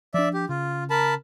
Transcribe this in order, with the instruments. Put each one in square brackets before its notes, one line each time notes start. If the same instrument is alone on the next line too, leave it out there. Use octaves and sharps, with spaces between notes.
[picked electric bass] F3 D4 [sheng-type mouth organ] D5 E5
[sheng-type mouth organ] G4
[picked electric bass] C#3 [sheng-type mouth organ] F4
[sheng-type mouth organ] A#4 A5 B5